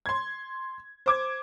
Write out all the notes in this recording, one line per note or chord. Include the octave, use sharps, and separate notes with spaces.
C6 G#6
C5 D6 G#6